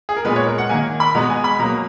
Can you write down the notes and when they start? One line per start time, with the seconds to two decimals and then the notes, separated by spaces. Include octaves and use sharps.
0.09 G#4
0.17 A#4
0.25 A#2 G#3 B3 B4
0.36 C#5
0.47 A#4
0.58 F#5
0.69 D#3 A#3 G#5
1.00 B5
1.15 B2 G#3 B3 A#5
1.30 G#5
1.44 B5
1.59 B2 F#3 A#3 A#5